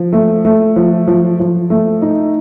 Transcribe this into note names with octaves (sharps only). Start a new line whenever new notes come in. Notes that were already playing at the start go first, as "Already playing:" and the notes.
Already playing: F3
A3
A3
F3
F3
F3
A3
D#4